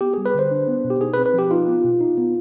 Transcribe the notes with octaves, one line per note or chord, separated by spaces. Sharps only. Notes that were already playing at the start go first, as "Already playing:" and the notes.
B3 G4
G3 G#4
B4
D3 C5
D4
B3
B2
G4
D#4 G#4
B4
C4
B4
F3 G4
D#4 F4
B3
B2
D#4
B3